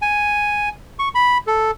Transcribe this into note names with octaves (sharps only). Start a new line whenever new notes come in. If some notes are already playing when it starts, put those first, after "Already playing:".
G#5
C#6
B5
A4